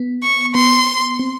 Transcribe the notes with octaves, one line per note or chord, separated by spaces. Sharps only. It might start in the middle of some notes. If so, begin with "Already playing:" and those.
Already playing: B3
C#6
B3 C6
C4